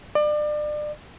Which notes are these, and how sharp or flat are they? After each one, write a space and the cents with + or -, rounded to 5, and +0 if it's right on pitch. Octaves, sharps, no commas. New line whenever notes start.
D5 +30